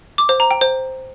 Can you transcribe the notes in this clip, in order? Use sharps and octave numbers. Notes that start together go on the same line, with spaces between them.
D6
C5
A#5
G5
C5